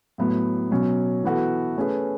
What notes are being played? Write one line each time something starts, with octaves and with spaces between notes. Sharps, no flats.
A2 F#3 B3
B2 F#3 C#4
E3 B3 F#4 A4
A3 C#4 G#4 B4